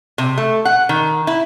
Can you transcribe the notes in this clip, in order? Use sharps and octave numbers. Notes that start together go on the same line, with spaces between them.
C3
A3
F#5
D#3
E4